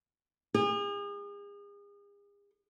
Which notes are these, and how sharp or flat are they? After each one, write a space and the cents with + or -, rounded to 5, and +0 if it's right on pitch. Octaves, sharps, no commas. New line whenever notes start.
G#4 -40